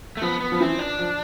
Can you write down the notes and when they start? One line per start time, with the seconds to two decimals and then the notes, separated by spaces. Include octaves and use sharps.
0.17 A3
0.22 F3 B3
0.40 B3
0.52 F3
0.60 E3 C4
0.79 D4
0.99 F3